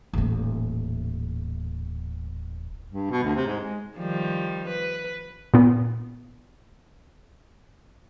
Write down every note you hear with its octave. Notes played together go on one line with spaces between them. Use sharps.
D#1 A1
G2
B2
D2
C3
G#2
G#3
D#3 F3 G3
B4
A#2 B3